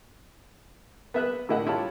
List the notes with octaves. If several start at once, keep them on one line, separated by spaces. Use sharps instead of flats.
B3 E5 F#6
A2 D3 E4 D#5 F#5
E4 F4 G4 C#5 A5